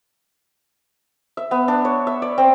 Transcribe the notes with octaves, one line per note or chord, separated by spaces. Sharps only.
E5
B3
D4
C#5
E5
D5
C4